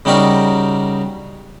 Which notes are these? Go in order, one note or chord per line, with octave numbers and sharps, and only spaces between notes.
C#3 G3 D#4 F#4 G4 A#4